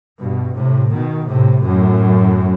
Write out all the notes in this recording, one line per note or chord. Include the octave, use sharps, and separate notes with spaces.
G2 B2
A2 C3
B2 D#3
A2 C3
F#2 A2